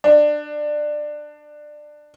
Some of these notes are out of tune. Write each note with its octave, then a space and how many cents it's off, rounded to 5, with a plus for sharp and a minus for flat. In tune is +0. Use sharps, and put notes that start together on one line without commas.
D4 +20